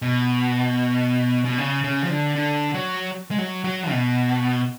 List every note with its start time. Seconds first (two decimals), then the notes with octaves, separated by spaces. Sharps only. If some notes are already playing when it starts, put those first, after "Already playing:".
0.02 B2
1.45 B2
1.58 C#3
1.84 C#3
2.04 F3
2.10 D3
2.35 D3
2.74 F#3
3.31 G#3
3.39 F#3
3.64 F#3
3.91 B2